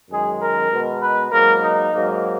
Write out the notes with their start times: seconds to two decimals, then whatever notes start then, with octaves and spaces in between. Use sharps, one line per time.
0.10 F#2 D#3 G#3 G#4
0.40 A#4
0.70 B2 G#3 B3
1.01 B4
1.31 G#2 F#3 A#3 A#4
1.61 D#4
1.92 G#2 F#3 A#3